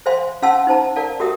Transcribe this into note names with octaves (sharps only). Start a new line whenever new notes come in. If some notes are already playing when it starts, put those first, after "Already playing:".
C5 E5 F5 G#5 C6
C#4 F5 F#5 A5 C6 E6
D#4 C5 A5 A#5
A#4 D5 F5 A5
F#4 G4 A#4 E5 D#6